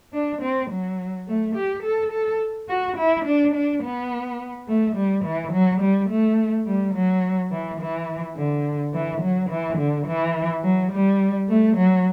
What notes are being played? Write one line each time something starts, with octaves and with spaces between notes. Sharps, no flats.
D4
C4
F#3
A3
G4
A4
A4
F#4
E4
D4
D4
B3
A3
G3
E3
F#3
G3
A3
G3
F#3
E3
E3
D3
E3
F#3
E3
D3
E3
F#3
G3
A3
F#3